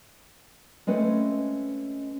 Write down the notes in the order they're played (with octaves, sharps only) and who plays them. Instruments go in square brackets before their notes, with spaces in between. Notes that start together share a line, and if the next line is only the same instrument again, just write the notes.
[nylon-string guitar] G#3 A3 C4 C#4 B4